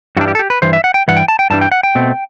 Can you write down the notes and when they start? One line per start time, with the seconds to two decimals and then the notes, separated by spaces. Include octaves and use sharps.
0.17 G2 E3 G3 D4 F#4
0.28 G4
0.35 A4
0.39 G4
0.50 B4
0.62 G2 E3 C5
0.73 E5
0.84 F#5
0.94 G5
1.08 G2 E3 F#5
1.17 G5
1.28 A5
1.39 G5
1.50 G2 E3 G3 D4 A5
1.61 G5
1.72 F#5
1.83 G5
1.95 B2 A3 C4